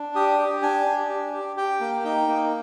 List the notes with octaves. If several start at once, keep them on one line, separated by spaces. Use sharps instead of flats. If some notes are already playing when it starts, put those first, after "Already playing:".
Already playing: D4
G4 D#6
G4
D4 G#5
D4
G4
G4
G4 G5
A#3
D#4 G5
A#3